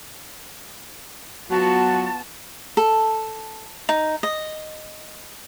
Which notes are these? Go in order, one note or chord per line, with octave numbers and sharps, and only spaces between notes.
F#3 B3 F4 F#4 A5
A4
D#4
D#5